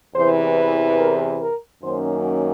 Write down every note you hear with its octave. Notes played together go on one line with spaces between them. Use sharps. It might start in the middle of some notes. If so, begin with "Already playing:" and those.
E2 C3 E3 C5
B4
A#4
A#4
F#2 D#3 F#3 A#3 C#4 C5